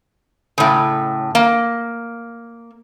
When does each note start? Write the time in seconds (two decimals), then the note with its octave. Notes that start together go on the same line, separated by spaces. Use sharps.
0.58 A2 C#3
1.35 A#3